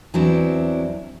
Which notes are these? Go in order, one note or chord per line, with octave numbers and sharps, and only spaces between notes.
E2 F#3 C4 D4 E4